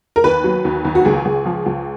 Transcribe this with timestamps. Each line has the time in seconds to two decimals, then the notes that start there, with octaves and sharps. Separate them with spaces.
0.16 A#4
0.24 D#2 B4
0.44 F#3
0.65 D#2
0.85 D#2
0.95 F#4
1.05 C#2 G#4
1.25 C#2
1.45 F3
1.66 C#2